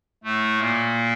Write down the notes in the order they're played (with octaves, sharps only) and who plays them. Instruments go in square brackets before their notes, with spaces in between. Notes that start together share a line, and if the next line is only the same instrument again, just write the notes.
[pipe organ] A2 A3
A#2 A#3